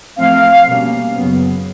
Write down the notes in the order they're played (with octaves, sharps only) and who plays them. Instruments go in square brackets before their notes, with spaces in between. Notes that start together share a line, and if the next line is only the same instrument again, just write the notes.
[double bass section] A2 F3 A3 C4 [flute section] F5
[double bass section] B2 G3 A#3 C#4
F#2 C#3 F#3 B3